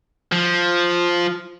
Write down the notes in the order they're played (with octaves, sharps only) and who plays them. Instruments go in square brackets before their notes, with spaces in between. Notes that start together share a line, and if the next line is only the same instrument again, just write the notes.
[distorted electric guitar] F3